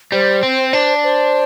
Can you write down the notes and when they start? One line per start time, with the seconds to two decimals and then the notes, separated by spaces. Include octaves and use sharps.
0.12 G3 C5
0.43 C4
0.73 D4
1.04 C5